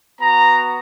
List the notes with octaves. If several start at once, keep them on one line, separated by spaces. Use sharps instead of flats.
B3 F#4 A#5